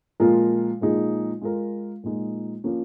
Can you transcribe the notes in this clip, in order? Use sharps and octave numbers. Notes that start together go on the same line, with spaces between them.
A#2 F3 G#3 F4 A#4
A#2 F3 G#3 D#4 G#4
G#3 F4 A#4
A#2 F3 G#3 D#4
F3 A#3 C#4 A#4